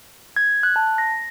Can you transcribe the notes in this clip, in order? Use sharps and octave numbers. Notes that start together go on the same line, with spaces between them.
G#6
F#6
A5
A#6